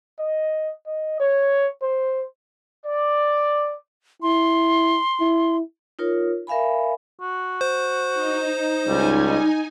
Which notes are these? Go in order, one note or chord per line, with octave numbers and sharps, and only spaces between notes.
D#5
D#5
C#5
C5
D5
E4 C6
E4
D#4 F4 A#4 C#5
A#4 E5 F5 G#5 B5
F#4
C5
D#4
C#2 G3 D#4 G#5